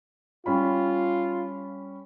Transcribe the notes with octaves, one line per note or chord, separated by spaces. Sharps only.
G3 C#4 F4 B5